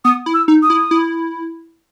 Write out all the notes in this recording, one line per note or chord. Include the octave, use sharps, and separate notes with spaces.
B3 D#6
E4
E6
D#4
D#6
E4
E4